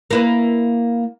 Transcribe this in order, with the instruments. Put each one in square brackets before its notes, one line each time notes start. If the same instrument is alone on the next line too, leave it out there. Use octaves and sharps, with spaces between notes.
[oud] A#3 E4 B4